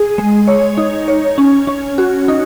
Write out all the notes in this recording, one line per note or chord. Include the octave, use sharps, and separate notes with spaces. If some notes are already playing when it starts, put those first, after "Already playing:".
Already playing: G#4
G#3
C#5
D#4
C#5
C#4
C#4
F#4
D#4